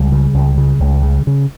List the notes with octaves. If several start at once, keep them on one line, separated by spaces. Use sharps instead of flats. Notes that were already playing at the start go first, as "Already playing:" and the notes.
Already playing: C#2 G3
C#3
C#2
C#3
C#2
C#3
C#3